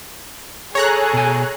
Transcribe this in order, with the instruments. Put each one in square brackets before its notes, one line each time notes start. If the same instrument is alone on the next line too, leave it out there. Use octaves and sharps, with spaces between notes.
[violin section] G#4 [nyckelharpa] A4 [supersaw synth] C#5 A#5 F#6
[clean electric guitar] B2 G#5